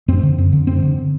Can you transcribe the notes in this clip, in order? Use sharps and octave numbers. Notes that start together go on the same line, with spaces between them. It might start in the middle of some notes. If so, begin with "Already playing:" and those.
F#2 C4
D3
F#2
D3
F#2 C4
D3